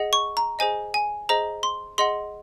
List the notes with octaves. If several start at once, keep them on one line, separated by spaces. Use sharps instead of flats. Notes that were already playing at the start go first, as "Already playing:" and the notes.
Already playing: G#4 D#5 F#5
C#6
A#5
G#4 C5 D#5 G#5
G#5
G#4 C5 D#5 A#5
C6
G#4 D#5 F#5 C6